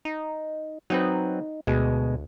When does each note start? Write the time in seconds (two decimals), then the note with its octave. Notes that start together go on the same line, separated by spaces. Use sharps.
0.05 D#4
0.90 F#3 C4 D#4 B4
1.67 D2 B2 G#3